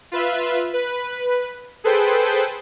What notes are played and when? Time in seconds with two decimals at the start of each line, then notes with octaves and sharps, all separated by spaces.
0.12 F4 B4 E5
0.73 B4
1.84 G#4 A4 B4 C5 G5